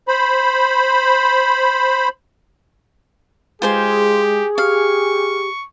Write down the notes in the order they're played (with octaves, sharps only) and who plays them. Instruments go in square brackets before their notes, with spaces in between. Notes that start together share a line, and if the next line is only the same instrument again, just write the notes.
[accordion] C5 B5
[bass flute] G#3 [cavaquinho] F4 C5 G#5 [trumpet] G4 [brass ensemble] G#4
[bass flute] G4 [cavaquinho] F5 [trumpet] C#6